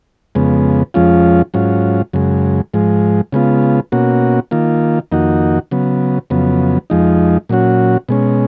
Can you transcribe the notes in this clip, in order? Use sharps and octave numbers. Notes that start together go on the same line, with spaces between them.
F2 C#3 G#3 B3
F2 F3 G#3 C#4 F4
G#2 F#3 C#4 F4
F#2 C#3 G#3
G#2 F3 G#3
C#3 G#3 B3 F4
B2 A#3 C#4 F#4
D#3 A#3 F4
F2 D#3 A#3 D#4 F#4
C#3 F#3 B3
F2 C#3 F#3 B3
F2 F3 G#3 D#4
A#2 F#3 C#4 F#4
B2 G#3 C#4